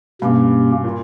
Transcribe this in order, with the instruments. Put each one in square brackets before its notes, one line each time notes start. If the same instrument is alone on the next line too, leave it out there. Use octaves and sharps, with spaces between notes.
[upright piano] G2 [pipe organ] B2 A#3 C#4 G4
[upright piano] A#2